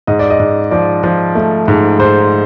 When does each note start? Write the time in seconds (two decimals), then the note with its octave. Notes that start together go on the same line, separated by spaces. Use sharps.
0.07 G#2 D#5
0.19 D5
0.30 D#5
0.39 G#2
0.71 F3 D5
1.04 F3
1.35 A3
1.68 G#2
1.99 G#2 C5